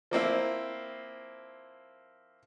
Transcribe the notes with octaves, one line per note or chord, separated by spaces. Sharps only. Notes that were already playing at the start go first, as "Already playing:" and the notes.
F3 A#3 C4 E4